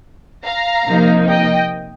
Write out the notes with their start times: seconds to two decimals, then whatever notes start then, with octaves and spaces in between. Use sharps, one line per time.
0.45 F5 A#5
0.87 C3 F3 A#3 D#4
1.29 D#5 G5